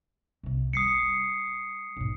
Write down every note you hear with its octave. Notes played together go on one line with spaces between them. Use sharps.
C2 C3
G3 D#6 C7 C#7
B1 G#2